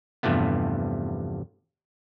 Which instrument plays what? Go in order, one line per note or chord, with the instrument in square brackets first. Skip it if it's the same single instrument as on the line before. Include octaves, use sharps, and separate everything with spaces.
[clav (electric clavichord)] E2 G2 C3 F3 A3 B3